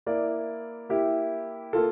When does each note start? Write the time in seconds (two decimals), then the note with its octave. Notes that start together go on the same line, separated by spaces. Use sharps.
0.06 A#3 E4 A#4 D5
0.89 A#3 E4 G4
1.73 A#3 F4 A4